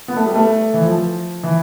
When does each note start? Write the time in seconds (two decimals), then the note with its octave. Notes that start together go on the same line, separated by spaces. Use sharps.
0.08 B3
0.16 A3
0.26 G3
0.36 A3
0.74 E3
0.82 F3
1.43 E3